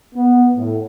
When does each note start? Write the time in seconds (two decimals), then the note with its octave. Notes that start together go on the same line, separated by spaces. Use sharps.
0.15 B3
0.56 A2